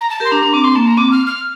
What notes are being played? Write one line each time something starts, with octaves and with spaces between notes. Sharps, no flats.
A#5
A5
G4 A#4
C6
D4 A#5
D4
C4 D6
C6
A#3 A5
A#5
C4 D6
F6
F6